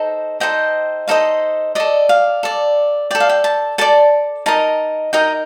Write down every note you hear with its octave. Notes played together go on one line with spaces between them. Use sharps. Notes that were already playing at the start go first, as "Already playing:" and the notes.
Already playing: D#4 A4 C5 D#5
D#4 A4 C5 D#5 G5
D#4 A4 C5 D#5 F5
A4 D5 D#5
F5
A4 D5
A4 D5 G5
F5
G5
A5
A4 D5 A5
D#4 A#4 D#5 A5
D#4 A#4 D#5 G5